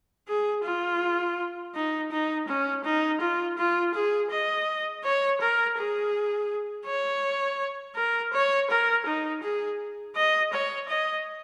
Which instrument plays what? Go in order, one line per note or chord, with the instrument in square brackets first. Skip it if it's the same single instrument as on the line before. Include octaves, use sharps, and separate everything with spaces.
[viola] G#4
F4
D#4
D#4
C#4
D#4
F4
F4
G#4
D#5
C#5
A#4
G#4
C#5
A#4
C#5
A#4
D#4
G#4
D#5
C#5
D#5